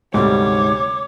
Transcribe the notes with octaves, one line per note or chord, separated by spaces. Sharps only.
D2 G#2 C3 G3 C#5 D6